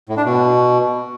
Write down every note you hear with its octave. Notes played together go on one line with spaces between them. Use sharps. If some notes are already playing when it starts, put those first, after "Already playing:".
A2
D4
B2